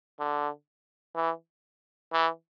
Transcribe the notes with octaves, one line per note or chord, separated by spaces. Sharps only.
D3
E3
E3